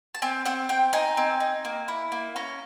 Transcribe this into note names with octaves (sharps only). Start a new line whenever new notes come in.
A5
C4 G#5
C4 F#5
C4 G5
D#4 G#5
C4
D#4
A#3
E4
A#3
C#4 A#5